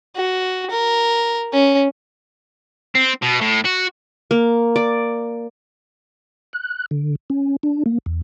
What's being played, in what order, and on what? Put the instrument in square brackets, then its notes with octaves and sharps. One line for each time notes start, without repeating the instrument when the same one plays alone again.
[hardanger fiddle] F#4
A#4
C#4
[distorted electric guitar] C4
B2
A2
F#4
[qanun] A#3
D5
[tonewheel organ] F#6
D3
C#4
D4
A#3
E2